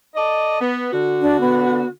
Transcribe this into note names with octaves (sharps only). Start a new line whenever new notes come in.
A4 D5 D#5
B3
D3 F#4
D4
B3